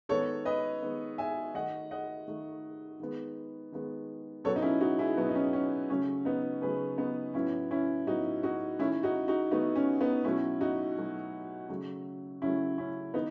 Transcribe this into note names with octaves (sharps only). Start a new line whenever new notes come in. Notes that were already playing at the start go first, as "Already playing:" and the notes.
D#3 G#3 B3 A4 C#5
B4 D#5
D#3 G#3 B3
E5 G#5
D#3 A3 D#5 F#5
D#5 F#5
D#3 A3
D#3 G#3 B3
D#3 G#3 B3
B2 F#3 B3 A4 C#5
D#4
C#4 E4
D#4 F#4
E4 G#4
B2 F#3 B3
D#4
C#4
C#4
C#3 F#3 A3 C#4
B3 D#4
C#3 F#3 A3 G#4 B4
B3 D#4
A2 F#3 B3 C#4 E4
C#4 E4
A2 F#3 B3 D#4 F#4
D#4 F#4
D#3 A3 C#4 E4
D#4 F#4
D#4 F#4
D#3 A3 B3 D#4
C#4
B3 D#4
B2 F#3 A3 C#4 E4
D#4 F#4
B2 F#3 A3
C#3 F#3 A3
C#3 F#3 A3 C#4 E4
C#4 E4
D#3 B3 D#4